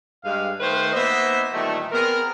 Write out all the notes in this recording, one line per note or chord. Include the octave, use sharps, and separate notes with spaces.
G2 G#3 F5
D#3 A3 B3 B4 C5
A#3 B3 D#4 C5 D#5 E5
A#2 D#3 E3 G3 A3
B3 C4 G#4 A#4